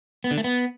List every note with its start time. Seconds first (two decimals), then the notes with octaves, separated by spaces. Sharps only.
0.24 B3
0.31 D3
0.38 A3
0.44 B3